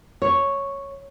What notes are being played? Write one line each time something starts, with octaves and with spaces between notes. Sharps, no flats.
C#5